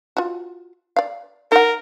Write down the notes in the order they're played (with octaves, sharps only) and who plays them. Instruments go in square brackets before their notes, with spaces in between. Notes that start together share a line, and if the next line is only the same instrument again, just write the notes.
[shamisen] F4 F#4
D5 F5
[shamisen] D#4 F#5 [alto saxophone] A#4